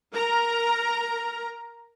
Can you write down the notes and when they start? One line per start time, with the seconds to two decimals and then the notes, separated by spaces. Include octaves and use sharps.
0.13 A#4 A#5